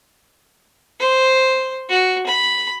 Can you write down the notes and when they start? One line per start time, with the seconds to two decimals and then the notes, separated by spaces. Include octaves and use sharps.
0.99 C5
1.89 F#4
2.26 B5